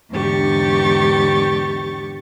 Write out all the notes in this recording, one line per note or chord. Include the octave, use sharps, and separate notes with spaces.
E2 G#2 D3 G4 C#6 A6